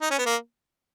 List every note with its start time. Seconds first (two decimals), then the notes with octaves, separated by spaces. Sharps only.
0.01 D#4
0.11 C#4
0.18 B3
0.26 A#3